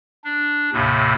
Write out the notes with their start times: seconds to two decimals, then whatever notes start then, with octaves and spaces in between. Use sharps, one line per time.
0.25 D4
0.73 D#2 A2 C3